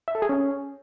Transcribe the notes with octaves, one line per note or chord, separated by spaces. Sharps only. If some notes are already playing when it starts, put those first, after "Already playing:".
E5
A4
G#4
C#4